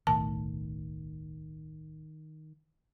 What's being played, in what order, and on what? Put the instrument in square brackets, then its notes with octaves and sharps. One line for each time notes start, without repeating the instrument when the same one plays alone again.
[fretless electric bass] D1 B1 A2 [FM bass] D#3 [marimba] A5